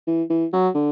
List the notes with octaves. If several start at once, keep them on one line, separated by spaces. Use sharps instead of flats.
E3
E3
F#3
D3